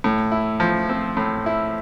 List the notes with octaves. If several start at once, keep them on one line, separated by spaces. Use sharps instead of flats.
A2
E4
F3
C4
A2
E4